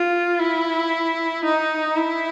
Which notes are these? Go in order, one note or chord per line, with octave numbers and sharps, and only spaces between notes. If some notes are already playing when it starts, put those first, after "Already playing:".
Already playing: F4
E4
D#4
E4